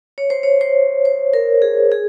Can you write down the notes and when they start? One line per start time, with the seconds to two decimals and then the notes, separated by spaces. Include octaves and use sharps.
0.18 C#5
0.30 C5
0.43 C#5
0.61 C5
1.05 C5
1.34 A#4
1.62 G#4
1.92 G#4